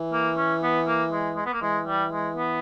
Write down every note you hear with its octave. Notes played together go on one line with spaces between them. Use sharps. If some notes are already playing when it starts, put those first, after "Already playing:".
Already playing: E3
A#3
C#4
B3
A#3
G#3
G#3
B3
A#3
E3 G#3
G3
G#3
B3